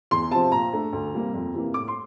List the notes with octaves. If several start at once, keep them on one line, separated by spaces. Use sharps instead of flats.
E2 C6
C3 F3 C4 A5
A#2 A#5
A3 D4
D2
C3 G3 A#3
F2
C3 E3 A#3
A2 D6
C6